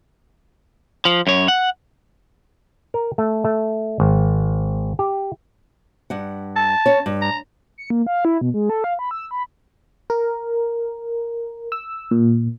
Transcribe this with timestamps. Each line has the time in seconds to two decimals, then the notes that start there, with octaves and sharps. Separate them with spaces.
1.05 F3
1.27 F#2 C#5
1.48 F#5
2.94 A#4
3.18 A3
3.44 A3
4.00 G#1
4.99 G4
6.10 G2 F#5
6.56 A5
6.86 C#4 C#5
7.06 G2
7.22 A#5
7.78 C#7
7.90 A#3
8.07 F5
8.25 E4
8.41 B2
8.54 G#3
8.70 A4
8.84 F5
8.99 B5
9.11 E6
9.31 B5
10.10 A#4
11.72 E6
12.11 A#2